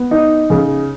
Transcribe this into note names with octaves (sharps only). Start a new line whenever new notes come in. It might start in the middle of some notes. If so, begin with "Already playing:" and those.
Already playing: B3
D#4
C#3